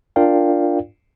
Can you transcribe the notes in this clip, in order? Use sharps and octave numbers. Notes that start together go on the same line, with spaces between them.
D4 F4 A#4 D5 F5 G5